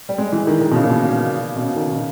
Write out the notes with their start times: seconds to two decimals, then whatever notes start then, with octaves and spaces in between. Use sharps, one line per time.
0.09 G3
0.18 G#3
0.32 E3
0.47 D#3
0.61 D#3
0.71 B2
0.75 C#3
0.84 A#2
0.90 B2
1.56 B2
1.62 C#3
1.76 D#3
1.91 C#3